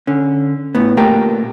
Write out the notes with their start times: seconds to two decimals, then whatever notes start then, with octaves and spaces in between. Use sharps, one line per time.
0.07 D3 C#4
0.75 A2 B3
0.97 A#2 A3 G4 A#4 G5 A5